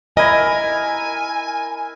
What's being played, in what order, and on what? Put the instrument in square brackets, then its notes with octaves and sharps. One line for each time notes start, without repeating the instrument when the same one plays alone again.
[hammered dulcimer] E4 A#4 [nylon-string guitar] D#5 [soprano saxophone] G#5